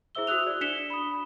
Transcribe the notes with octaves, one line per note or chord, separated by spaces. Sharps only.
E4 G#4 C5 E5 E6 G7
F#4 D#6 E6 F#6 F7
D5
D4 B6 C#7 E7 G7
B5 D#6